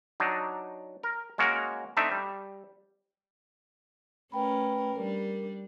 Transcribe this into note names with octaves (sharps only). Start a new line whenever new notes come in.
F#3 D4 D#4
A#4
G#3 A#3 C#4 F#4 A#4
A3 C4 D4 D#4 E5
G3
A3 C#4 A#4 B4 G5 B5
G3 D4 A#4